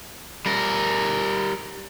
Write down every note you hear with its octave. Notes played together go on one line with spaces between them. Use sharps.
G3 A#4